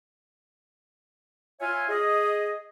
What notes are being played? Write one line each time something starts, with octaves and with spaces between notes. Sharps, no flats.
F4 C#5 E5 F5 G#5
G#4 D#5